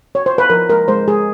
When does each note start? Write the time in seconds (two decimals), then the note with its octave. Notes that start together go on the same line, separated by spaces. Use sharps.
0.15 C#5
0.26 C5
0.38 B4
0.50 F3 A#4
0.69 G#3 A#4
0.88 G#3 C5
1.08 G#3 G#4